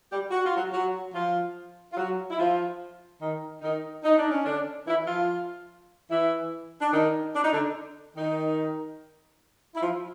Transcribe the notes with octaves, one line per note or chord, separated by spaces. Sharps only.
G3 G4
F#4
F4
F#3 F#4
F#3 F#4
F3 F4
F4
F#3 F#4
E4
F3 F4
D#3 D#4
D#3 D#4
D#4
D4
C#4
D3 D4
E3 E4
F3 F4
E3 E4
D4
D#3 D#4
D4
D#4
D3 D4
D#3 D#4
E4
F3 F4